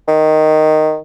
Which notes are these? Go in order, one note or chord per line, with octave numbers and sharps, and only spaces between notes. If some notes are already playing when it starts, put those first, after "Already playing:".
D#3